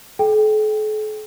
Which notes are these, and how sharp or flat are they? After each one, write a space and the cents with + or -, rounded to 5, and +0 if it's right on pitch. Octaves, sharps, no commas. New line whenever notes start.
A4 -45 G5 +0